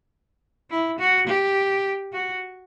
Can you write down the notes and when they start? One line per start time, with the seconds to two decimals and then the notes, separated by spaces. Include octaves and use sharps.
0.70 E4
0.99 F#4
1.27 G4
2.13 F#4